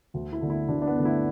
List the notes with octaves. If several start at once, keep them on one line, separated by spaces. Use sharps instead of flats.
D2
E4
D3 A3
E4
D2 D4
D4
B3
D3 A3
E4